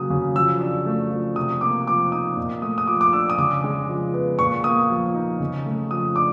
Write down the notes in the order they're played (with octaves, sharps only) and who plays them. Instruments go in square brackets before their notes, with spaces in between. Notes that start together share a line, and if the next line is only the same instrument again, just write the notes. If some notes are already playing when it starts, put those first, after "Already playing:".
Already playing: [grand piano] C#3 F#3 A#3 D#6
C#3
F3 E6
D4
A3
F3
C3 D#6
A#3 D6
F3 D6
D#4 D#6
A#2
A3 D#6
D#6
F3 D6
D6
D4 E6
D#6
C#3 D6
G#3
F3
B3
A#2 C#6
A#3 D#6
F3
D#4
C#3
A3
F3 D#6
D4 D6